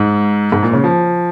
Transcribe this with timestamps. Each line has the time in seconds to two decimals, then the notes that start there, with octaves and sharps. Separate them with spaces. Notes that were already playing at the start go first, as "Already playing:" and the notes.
Already playing: G#2
0.52 G#2
0.63 A#2
0.73 C#3
0.84 F3